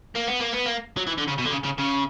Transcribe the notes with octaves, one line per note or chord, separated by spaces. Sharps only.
A#3
B3
A#3
B3
A#3
F#3
E3
D3
C#3
B2
D3
C#3
C#3
C#3